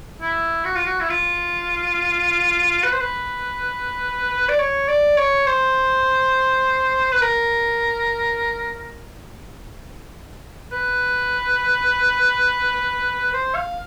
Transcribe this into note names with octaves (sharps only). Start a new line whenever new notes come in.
E4
F#4
F4
F#4
E4
F4
B4
C5
B4
D5
C#5
D5
C#5
C5
B4
A#4
B4
C5
F5